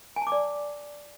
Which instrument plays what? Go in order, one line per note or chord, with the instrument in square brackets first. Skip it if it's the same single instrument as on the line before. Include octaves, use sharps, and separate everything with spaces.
[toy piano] G#5
A5
D6
D5